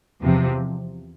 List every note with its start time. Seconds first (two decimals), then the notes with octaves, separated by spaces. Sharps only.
0.22 E2 C3 F3